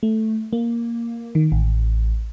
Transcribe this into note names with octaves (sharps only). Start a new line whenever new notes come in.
A3
A#3
D#3
A1